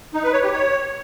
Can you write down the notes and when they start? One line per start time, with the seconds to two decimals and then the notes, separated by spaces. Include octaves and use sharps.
0.14 D#4
0.24 B4
0.33 C#5
0.42 G4
0.52 C#5